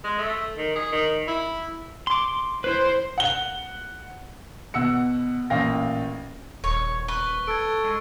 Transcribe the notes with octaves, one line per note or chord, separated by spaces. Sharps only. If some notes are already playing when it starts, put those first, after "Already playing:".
G#3
A3
D#3
G#4
D#3
E4
C6 D6
E4 B4 C5
F#5 G7
B2 F#5 E6 C#7
A1 A#2 F5 G5 A#6
D#1 C#5 C#6
B4 C#6 G7
A4 G#6 D7
G#3